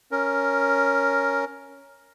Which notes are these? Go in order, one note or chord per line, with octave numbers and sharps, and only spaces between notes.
C#4 A#4